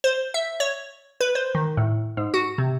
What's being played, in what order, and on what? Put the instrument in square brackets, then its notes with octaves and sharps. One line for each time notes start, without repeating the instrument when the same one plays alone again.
[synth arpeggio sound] C5
E5
C#5
B4
C5
D#3
A2
G#2
F#4
C3